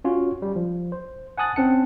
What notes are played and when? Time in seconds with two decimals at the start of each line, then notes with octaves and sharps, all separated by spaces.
0.04 C#4 F4 F#4 C#5
0.42 G3
0.56 F3
0.92 C5
1.38 F#5 G#5 A5 D#6 F#6 A6
1.56 C4 C#4 F#5 A5 C#7